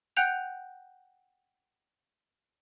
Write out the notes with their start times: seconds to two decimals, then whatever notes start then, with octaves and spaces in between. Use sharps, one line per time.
0.17 F#5 G5 F#6 G6 F7